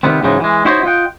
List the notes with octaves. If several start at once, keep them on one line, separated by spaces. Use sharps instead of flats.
C3 D#3 G3 G#3 B3 C4
G#2 C#3 E3 F#3 G#3 D#4
E3 G#3
D#4 E4 F#4 C5 C#5 D#5
F4 D#5 F#5 G5